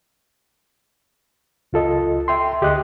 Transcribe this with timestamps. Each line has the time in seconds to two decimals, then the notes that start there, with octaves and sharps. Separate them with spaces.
1.73 C#2 F4 A4 D#5
2.28 E5 G5 C6
2.62 D2 G4 G#4 D#5 G5 F#6